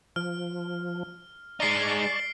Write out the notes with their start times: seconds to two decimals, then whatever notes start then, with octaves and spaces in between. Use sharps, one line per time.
0.16 F3 F6
1.60 G#3 D#4 D5 A5 C#6 C7 D7 G7